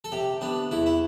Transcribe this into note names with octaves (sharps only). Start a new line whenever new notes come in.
A4
C3 G4
B3 D4
E2 E4
E4